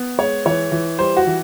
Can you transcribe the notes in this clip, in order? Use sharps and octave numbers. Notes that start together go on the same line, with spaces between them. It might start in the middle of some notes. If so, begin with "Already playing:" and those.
Already playing: B3
G#3 C#5
E3 C#5
E3
G3 C5
F#4
E3